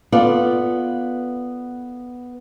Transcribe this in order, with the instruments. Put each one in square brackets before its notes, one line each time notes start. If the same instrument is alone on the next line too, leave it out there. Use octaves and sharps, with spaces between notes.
[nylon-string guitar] B3 F4 A4 D5